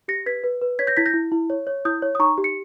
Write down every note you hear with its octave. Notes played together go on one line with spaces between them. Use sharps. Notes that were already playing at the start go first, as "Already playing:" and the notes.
G4 A#6 C#7
B4 G#6 B6
B4
B4
C#5 G#6 B6
G6 A#6
E4 G#6 B6
G6 A#6
E4
E4
C#5
C#5
E4 D#6 G6
C#5
D#6
D#4 A#5 C#6
G4
C#7